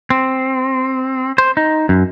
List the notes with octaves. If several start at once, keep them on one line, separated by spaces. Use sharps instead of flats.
C4
C5
D#4
F#2